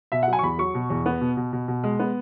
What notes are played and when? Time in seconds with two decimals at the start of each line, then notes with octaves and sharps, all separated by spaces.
0.12 B2 E5
0.23 F#3 F#5
0.33 G#5
0.39 C#6
0.43 E2 B5
0.59 F#3 C#6
0.74 B2
0.90 E2
1.06 B3
1.21 B2
1.37 B2
1.53 B2
1.68 B2
1.84 G#3
1.99 B3